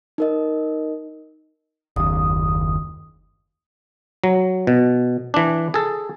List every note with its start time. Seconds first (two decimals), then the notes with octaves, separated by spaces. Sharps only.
0.18 D#4 A#4 D#5
1.96 F#1 D#2 D#6
4.24 F#3
4.67 B2
5.34 E3 D4
5.74 G#4 A4